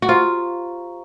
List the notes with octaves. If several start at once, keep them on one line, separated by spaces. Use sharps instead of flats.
F#4
F4 G4 C5 F5 A#5 C#6